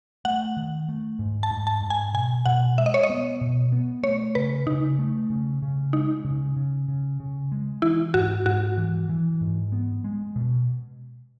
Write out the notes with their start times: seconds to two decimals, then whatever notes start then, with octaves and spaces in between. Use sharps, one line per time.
0.25 A3 F#5
0.57 D#3
0.89 A3
1.19 G#2
1.43 A5
1.51 G#2
1.67 A5
1.82 G#2
1.90 G#5
2.14 B2 G#5
2.46 B2 F#5
2.78 G#3 E5
2.86 D#5
2.94 C#5
3.03 D#5
3.10 B3
3.41 B2
3.72 B3
4.03 A3 C#5
4.35 C#3 B4
4.67 C#3 D#4
4.99 A3
5.30 C#3
5.62 C#3
5.93 G#3 D#4
6.25 C#3
6.57 C#3
6.88 C#3
7.20 C#3
7.52 G#3
7.82 E3 E4
8.14 G#2 F#4
8.46 G#2 F#4
8.78 E3
9.09 E3
9.41 G#2
9.72 B3
10.04 G#3
10.36 B2